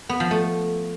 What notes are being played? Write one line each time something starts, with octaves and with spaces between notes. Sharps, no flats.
B3
F3
A3